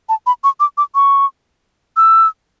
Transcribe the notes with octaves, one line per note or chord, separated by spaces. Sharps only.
A5
B5
C#6
D6
D6
C#6
E6